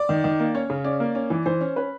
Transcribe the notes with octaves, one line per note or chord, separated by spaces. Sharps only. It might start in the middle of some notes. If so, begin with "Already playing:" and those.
Already playing: D5
D#3
D#3
A#3
C#4 C#5
C#3
C#4 D5
A#3
C#4
E3
E3 C5
C#4
C#4 B4